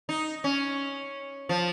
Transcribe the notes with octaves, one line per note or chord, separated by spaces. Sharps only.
D#4
C#4
F3